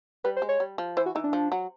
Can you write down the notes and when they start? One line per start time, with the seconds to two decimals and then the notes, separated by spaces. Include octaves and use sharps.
0.24 G3 B4
0.36 C5
0.42 G#3
0.49 C#5
0.60 G3
0.78 F3
0.97 E3 C5
1.06 F#4
1.15 E3 D#4
1.24 D4
1.33 F3
1.52 F#3